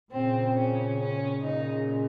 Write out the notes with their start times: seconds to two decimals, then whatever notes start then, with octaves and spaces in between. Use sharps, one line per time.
0.11 A#2 C#3 C4
0.55 C#4
0.98 C#4
1.41 A#2 C#3 D#4